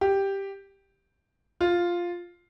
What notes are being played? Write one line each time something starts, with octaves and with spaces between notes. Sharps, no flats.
G4
F4